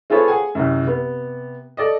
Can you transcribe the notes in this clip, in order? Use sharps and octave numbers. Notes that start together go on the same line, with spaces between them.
C4 F4 G#4 A4 B4 C#5
G#4 F#5 G#5
C2 F#2
C3 B3
A4 D5 D#5